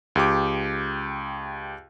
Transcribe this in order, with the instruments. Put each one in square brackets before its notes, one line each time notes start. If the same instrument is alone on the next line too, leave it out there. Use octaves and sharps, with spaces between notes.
[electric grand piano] C#2 G4 D6